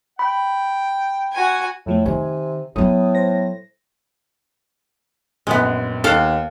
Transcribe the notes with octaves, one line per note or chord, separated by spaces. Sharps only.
G5 B5
F#4 G#5
F2 A2 F3 A3
C3 D#3 G#5
A2 F#3 B3 D#6
C5 A#6
A#1 F#2 G#3 B3
D#2 A4 F5 F#5